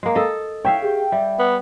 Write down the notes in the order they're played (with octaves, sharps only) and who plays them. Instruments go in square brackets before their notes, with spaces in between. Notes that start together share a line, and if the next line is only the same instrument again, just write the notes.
[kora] G#3 A#3
A4 D#5
[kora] C#5 E5 F5 [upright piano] G5
[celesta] G4 G#4
[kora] G3 [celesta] E5
[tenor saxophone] B3